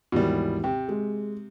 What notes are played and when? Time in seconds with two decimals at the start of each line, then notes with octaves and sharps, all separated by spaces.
0.12 D#2 G#2 B2 E3 G3
0.64 C3 G5
0.89 G#3